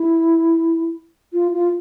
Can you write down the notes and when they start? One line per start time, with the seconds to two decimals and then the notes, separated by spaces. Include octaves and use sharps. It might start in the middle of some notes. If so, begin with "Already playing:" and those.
Already playing: E4
1.33 F4
1.54 F4